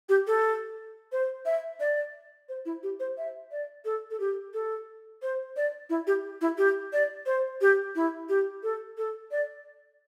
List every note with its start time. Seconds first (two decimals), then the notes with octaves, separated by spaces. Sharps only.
0.09 G4
0.27 A4
1.12 C5
1.46 E5
1.80 D5
2.49 C5
2.66 E4
2.83 G4
3.00 C5
3.18 E5
3.52 D5
3.85 A4
4.11 A4
4.20 G4
4.54 A4
5.22 C5
5.57 D5
5.90 E4
6.07 G4
6.41 E4
6.58 G4
6.93 D5
7.26 C5
7.61 G4
7.96 E4
8.29 G4
8.63 A4
8.98 A4
9.31 D5